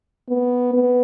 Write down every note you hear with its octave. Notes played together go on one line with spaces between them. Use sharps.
B3
B3